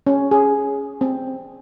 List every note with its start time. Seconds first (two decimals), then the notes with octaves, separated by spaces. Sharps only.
0.07 C#4
0.31 G#4
1.01 C4